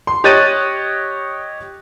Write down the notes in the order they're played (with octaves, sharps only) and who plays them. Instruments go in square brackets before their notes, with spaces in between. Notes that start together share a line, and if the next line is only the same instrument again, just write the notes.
[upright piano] C6
G4 C#5 D#5 F#6 A6 D#7